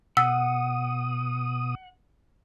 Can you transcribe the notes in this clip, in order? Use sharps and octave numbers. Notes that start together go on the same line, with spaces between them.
B2 F#5 D#6 E6